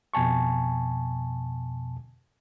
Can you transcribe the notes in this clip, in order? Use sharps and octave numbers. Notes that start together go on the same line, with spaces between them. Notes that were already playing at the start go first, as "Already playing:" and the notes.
F2 B2 G#5 A5 C#6